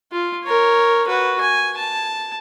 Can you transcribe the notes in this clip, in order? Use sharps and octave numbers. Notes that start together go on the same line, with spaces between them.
F4
A#4 C#5
F#4 B4
G#5
A5